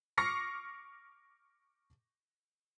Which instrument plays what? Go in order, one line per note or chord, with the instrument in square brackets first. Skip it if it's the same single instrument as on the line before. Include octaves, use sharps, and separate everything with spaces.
[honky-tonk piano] C#6 D6 F6 A#6 C7 C#7